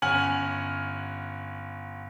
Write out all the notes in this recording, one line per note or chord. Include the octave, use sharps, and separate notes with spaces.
G1 C#4 F#5 G#5 F6 F#7